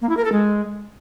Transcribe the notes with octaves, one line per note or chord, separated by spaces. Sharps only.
A#3
E4
A#4
A4
G#3